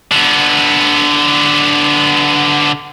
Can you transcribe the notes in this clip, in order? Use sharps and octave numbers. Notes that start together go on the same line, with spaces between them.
D3 B3